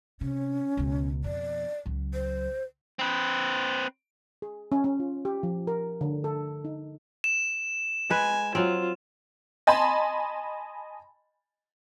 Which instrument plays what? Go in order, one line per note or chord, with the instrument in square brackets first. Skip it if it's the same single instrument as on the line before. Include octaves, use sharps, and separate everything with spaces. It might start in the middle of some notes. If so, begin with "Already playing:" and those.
[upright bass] C3 [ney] C#4
[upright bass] C#2 B2
[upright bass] F2 B2 [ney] D5
[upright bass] C#2 F#3
[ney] C5
[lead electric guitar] C4 B4
[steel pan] G#4
C#4
C#4
F4
G4
F3
A#4
D3
A4
D#4
[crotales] E7
[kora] G#3 B4 [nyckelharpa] G#5
[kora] F#3 C4 [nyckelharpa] F4
[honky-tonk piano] D#5 G#5 A5 B5 C6